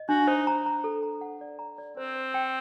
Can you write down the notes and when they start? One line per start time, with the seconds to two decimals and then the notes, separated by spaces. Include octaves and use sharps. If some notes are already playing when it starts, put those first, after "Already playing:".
Already playing: D#5
0.09 D4 F#4
0.27 D#4 C5
0.47 A#5
0.66 A#5
0.84 A4
1.03 A#5
1.21 F#5
1.41 D5
1.59 A#5
1.78 D5
1.97 C4 C5
2.16 C5
2.34 G5